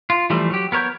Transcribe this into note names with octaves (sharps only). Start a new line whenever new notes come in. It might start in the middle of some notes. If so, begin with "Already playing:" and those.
F4
E3 F3 G3 A3
F#3 G4
B3 A#4 C#5 G6